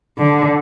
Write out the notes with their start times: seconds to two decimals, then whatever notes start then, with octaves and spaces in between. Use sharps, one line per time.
0.18 D3